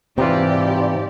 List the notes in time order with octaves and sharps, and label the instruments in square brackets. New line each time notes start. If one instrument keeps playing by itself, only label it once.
[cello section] G#2 G4 D5 [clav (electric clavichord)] C3 E3 F4 [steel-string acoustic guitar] C4